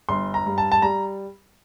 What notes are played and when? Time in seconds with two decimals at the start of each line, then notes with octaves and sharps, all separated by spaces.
0.09 G1 C6
0.34 A#5
0.46 G2
0.58 A5
0.72 A5
0.82 G3 A#5